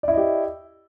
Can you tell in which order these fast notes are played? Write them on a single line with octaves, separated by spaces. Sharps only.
D5 E4 D#5 G4